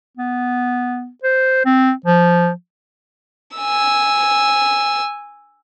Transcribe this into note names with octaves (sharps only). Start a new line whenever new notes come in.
B3
C5
C4
F3
G#5 E6